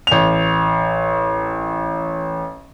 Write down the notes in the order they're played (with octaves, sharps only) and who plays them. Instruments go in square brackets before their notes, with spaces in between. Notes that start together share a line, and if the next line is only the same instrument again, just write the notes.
[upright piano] A1 F7